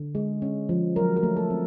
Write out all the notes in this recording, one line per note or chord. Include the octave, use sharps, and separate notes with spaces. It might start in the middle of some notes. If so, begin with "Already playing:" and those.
Already playing: D3
G#3
C#4
F3
F#3 A#4
A#4
A3
A4
C4